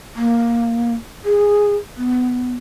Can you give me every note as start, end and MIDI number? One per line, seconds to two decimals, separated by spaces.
0.15 0.94 58
1.25 1.76 68
1.97 2.55 59